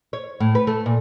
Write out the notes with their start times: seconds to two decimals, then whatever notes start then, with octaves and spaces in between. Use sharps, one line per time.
0.13 C#5
0.40 A2
0.55 B4
0.67 A3
0.86 A#2